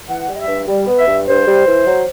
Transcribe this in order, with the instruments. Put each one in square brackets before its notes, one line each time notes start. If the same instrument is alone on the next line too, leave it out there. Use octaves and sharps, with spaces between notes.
[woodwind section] E3 F#5
G3
D#5
E5
G2
G3
B3
E5
G2
G2 C5
G3
E3
F#3